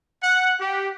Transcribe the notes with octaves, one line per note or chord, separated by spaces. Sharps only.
F#5
G4